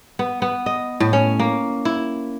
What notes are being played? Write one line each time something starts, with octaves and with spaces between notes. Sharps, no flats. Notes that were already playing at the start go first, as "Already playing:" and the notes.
B3
B3
D#5
A2
C#4
A#3
E4